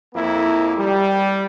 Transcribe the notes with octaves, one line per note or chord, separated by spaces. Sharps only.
F2 A#3 E4
G3